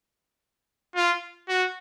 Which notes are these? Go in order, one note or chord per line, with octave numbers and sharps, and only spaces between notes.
F4
F#4